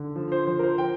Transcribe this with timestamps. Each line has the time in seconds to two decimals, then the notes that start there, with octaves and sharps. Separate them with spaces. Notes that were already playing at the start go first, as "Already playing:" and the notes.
Already playing: D3
0.16 F3
0.32 C5
0.47 F3 C5
0.59 A#4
0.63 C5
0.78 G5